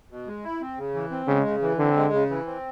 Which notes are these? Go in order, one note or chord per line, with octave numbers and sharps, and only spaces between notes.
B2
G#3
E4
C4
C#3
E3
C4
C#3 G#3
C#3
E3
D3 C4
G#3
C#3
E3
C4